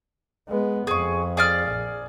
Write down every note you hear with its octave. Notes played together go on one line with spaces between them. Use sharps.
G#3 B3
F2 G#4 C#6
G#4 D5 F6
A#1